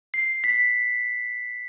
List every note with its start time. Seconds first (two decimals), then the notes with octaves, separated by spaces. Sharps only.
0.14 C7
0.44 B6